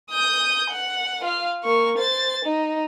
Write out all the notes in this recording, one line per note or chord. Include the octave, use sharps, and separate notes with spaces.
D#6 G6
F#5
F4 F5
A#3 C#6
C5 A6
D#4